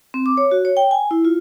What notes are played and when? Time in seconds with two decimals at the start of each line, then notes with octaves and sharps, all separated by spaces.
0.14 C4
0.26 D6
0.37 C#5
0.51 F#4
0.65 C#5
0.77 G5
0.91 G#5
1.11 E4
1.25 F4